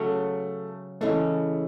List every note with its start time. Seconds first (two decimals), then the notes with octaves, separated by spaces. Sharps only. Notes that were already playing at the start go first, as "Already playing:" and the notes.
Already playing: C#3 F#3 A3 C#4
1.01 C#3 E3 G#3 A3 C#4